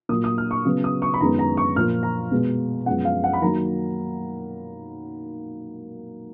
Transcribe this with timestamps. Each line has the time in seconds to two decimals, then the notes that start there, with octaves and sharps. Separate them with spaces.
0.09 A#2 F#3 A#3 D#6
0.24 D#6
0.38 F6
0.51 C#6
0.65 C#3 F#3 B3
0.84 D#6
1.02 C#6
1.14 B5
1.21 F#2 D#3 G#3 B3 A#5
1.39 A#5
1.57 C#6
1.76 A#2 F3 A#3 F6
2.03 A#5
2.31 B2 G#3 B3
2.86 F#2 F3 G#3 B3 F#5
3.05 F5
3.24 F#5
3.33 B5
3.42 D#3 F#3 A#3 A#5